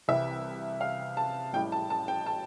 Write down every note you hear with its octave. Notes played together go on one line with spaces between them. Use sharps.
C2 C3 E3 G3 E5
F5
A5
A1 A2 G3 G5
A5
A5
G5
A5